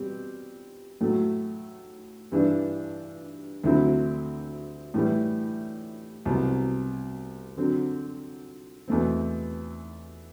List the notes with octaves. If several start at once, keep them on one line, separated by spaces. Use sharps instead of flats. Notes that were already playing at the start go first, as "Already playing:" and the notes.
Already playing: B2 G3 C4 G4
A2 F#3 A3
G2 E3 G3 D4
D2 D3 F#3 C4 E4
A2 E3 G3
C2 B2 F#3
D3 F#3 C4
E2 B2 A3 C4